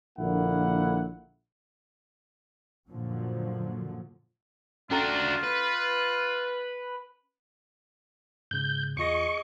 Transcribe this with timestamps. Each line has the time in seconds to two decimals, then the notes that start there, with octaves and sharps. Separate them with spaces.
0.18 A#1 D3 A#3 E4 F#5
2.88 F#2 A#2 D3 F3 F#3
4.91 C#4 D4 F4 F#4 A4 A#5
5.44 B4
8.51 G#2 C#3 G6
8.97 E2 F4 G#4 D#5 C#6 A#6